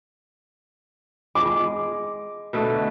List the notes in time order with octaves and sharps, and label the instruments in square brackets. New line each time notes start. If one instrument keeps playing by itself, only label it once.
[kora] G#3 [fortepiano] D6
[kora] B2 D3 A3